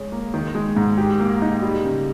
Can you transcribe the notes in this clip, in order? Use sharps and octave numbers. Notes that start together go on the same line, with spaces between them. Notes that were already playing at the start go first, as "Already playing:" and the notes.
Already playing: G#3 G#4 C#5
A#3
D#3
G#3
G#2
G4
A#3
D#4
G3
C#3